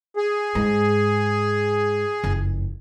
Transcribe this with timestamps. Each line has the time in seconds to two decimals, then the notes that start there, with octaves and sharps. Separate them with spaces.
0.16 G#4
0.55 G#2
2.24 F#1 F2